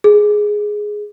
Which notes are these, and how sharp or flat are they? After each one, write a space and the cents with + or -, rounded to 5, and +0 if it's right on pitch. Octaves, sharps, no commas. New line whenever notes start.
G#4 +5